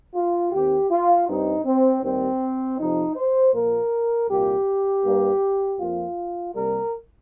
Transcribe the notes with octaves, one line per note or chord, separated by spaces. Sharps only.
F4
D#2 D#3 C4 G4
F4
G2 G3 C4 D#4
C4
D#2 D#3 G3 C4
F2 C3 F3 D#4
C5
A#2 F3 A#3 A#4
C2 A#2 A#3 G4
G2 G3 A#3
F2 F3 A#3 F4
C2 C3 G3 A#3 A#4